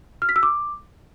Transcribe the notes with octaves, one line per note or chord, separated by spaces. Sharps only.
F6
B6
E6
D6